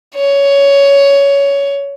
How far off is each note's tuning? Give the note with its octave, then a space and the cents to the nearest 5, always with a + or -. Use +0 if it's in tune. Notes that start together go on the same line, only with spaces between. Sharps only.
C#5 +15